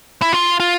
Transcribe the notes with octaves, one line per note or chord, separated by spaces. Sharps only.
E4
F4
F4